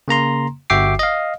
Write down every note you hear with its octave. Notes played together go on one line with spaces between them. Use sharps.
C#3 A#3 A#5 C6
G1 F#4 E5 G5 D6 C7
D#5 F5